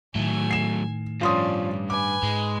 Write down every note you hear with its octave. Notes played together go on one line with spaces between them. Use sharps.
A2 D#3 F#3 A3 G#5
C7 E7
G2 F3 C#4 D5 C6 D#6
B4 G#5 D6
G#2 G#3